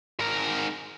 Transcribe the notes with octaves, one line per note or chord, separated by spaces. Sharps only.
G#2 A#4